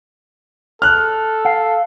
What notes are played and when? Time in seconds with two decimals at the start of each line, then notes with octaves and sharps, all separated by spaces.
0.82 A4 F6 F#6
1.45 F5